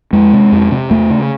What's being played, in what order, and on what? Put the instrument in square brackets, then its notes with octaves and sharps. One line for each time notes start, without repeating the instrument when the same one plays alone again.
[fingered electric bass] F2 G#3
C3
F2
C3
E2 A3
C#3